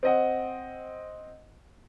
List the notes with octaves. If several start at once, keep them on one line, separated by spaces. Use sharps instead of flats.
C4 D#5 F#5